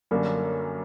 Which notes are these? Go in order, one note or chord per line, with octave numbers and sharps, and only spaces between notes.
F#2 D3 G3 A#3 C#4 A#4